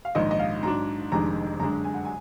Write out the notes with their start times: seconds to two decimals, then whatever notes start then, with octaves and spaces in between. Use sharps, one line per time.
0.05 F5
0.15 A#1 G#2 D#3 D#5
0.31 D#5
0.39 F5
0.63 G#2 F#3 D4 A#5
1.12 F1 F2 D#3 G#3 D4 A#5
1.60 F#2 D3 G#3 D4 A#5
1.84 G#5
1.94 F#5
2.05 G#5